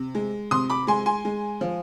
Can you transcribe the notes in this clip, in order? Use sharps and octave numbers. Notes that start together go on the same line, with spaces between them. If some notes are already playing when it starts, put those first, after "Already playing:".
Already playing: C3
G#3
C3 C6 D#6
B5 D6
G#3 G#5 C6
G#5 C6
G#3
F3